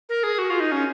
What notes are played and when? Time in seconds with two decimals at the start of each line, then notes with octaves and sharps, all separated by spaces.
0.09 A#4
0.23 G#4
0.38 F#4
0.50 F4
0.60 D#4
0.72 C#4